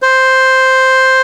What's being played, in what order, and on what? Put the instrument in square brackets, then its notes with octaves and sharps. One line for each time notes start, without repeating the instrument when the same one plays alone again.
[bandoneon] C5